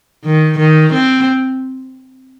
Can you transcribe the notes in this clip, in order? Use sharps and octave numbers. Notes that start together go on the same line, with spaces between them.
D#3
D#3
C4